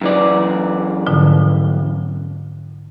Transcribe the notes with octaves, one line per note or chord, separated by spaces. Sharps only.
F#2 E3 D5
G#2 D3 F3